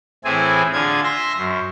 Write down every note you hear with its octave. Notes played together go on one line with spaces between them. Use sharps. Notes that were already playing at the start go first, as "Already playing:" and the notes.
A2 E3 C4 E4 G#4 G#5
D3 F4 G#4 G#6
E5 C6 A#6
F#2